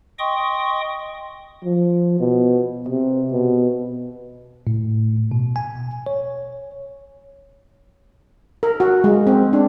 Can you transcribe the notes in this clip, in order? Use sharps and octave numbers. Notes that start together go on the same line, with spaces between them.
D#5 G5 C6 C#6 D#6
F3
B2
C3
B2
A2
B2
G#5
C#5
A#4
F#4
G#3
C4
D4